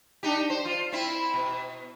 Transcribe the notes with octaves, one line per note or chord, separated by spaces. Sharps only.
D4 D#4 G4
C5
F4
C4 E4
B2